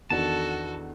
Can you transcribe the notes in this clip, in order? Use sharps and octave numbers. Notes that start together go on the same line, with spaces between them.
E2 D#3 D4 F#4 A4 A5